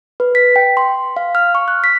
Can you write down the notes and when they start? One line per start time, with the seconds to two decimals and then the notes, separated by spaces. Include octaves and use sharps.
0.20 B4
0.35 B6
0.56 G5
0.77 C6
1.17 F5
1.35 F6
1.55 C#6
1.68 F#6
1.84 B6